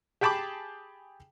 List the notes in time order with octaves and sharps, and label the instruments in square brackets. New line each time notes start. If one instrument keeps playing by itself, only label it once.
[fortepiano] G4 G#4 G5 A5 B5 D6